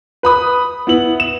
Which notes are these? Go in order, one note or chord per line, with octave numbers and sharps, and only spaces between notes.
B4 B5 D#6
B3 E4 F#7
E7